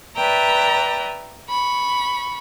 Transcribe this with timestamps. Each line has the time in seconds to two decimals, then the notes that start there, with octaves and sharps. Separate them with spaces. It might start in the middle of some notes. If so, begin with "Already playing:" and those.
0.15 B4 D5 E5 G5 A#5
1.49 B5 C#6